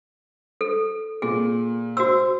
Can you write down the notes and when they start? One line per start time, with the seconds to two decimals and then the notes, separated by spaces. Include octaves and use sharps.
0.61 A4
1.22 A#2 G#4
1.97 F#4 C5 E6